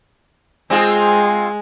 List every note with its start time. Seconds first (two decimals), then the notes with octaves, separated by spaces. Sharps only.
0.70 G#3 C4 F4 G#4